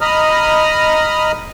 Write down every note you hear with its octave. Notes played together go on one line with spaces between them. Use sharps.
D#5 A#5 B5 D#6 F6